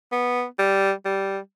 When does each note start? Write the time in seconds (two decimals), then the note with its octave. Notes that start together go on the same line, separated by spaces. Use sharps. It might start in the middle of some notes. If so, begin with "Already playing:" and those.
0.12 B3
0.59 G3
1.05 G3